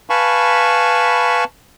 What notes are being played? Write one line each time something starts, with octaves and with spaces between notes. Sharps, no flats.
B4 F5 G#5 A5 B5 C#6